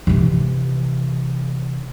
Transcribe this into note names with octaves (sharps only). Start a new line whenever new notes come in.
C3 E3